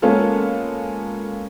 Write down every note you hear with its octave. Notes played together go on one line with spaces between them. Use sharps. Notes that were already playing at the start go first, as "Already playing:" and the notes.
G#3 A#3 B3 C#4 F4 A4